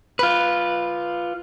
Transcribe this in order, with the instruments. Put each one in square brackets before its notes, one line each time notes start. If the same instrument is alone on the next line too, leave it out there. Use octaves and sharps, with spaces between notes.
[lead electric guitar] F4 B4